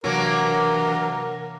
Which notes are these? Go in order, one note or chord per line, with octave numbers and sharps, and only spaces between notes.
C3 E3 F#3 A#3 D4 A#4